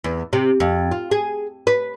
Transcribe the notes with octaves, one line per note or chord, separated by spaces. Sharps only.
E2
C3
F2
F4
G#4
B4